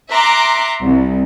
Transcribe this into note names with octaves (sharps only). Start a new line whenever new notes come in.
E5 A#5 C6 D6 F#6
C2